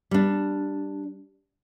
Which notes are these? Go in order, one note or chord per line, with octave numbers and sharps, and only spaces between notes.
G3 D4